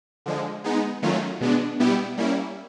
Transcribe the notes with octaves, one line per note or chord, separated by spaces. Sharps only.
D3 F3 G#3
G#3 B3 D#4
D#3 F#3 A3 C#4 F4
B2 G#3 B3 D4
B2 G3 B3 E4 G4
G3 A#3 C#4 E4